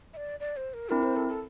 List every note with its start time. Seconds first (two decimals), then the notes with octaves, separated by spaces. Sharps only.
0.13 E5
0.17 D5
0.40 D5
0.57 C5
0.74 A#4
0.90 C4 D4 E4 A#4
1.03 C5
1.16 A4
1.28 A4